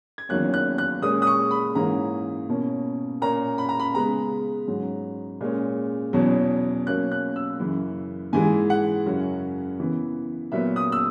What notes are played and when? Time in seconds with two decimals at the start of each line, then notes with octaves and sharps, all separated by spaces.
0.18 G#6
0.29 E2 D#3 F#3 A#3 C#4 F#6
0.54 F#6
0.78 F#6
1.02 A#2 G#3 C#4 D#6
1.22 D#6
1.27 C#6
1.51 B5
1.75 G#2 E3 A#3 C#4 A#5
2.49 B2 A#3 C#4
3.22 A#2 A#3 C#4 A#5
3.58 B5
3.69 A#5
3.80 B5
3.94 C#3 G#3 B3 A#5
4.67 G#2 F#3 C#4
5.41 A#2 G#3 C#4
6.13 E2 B2 F#3 C#4
6.86 B2 F#3 A#3 C#4 F#6
7.12 F#6
7.36 E6
7.60 F#2 C#3 E3
8.33 G#2 E3 G#3 G#5
8.70 F#5
9.06 F#2 C#3 F#3 C#4
9.79 C#3 E3 B3
10.52 A#2 F#3 B3 E5
10.76 D#6
10.92 E6